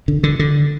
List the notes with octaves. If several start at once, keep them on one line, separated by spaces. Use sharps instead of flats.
D3
D3
D3